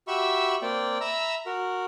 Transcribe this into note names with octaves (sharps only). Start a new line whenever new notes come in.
F#4 G4 E5 B5 C#6 E6
A#3 C4 D5 G5
E5 A#5 B5 E6
F#4 A#4